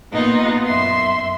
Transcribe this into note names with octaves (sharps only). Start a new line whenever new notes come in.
A#2 B3 D#4 F4
F#2 E5 C6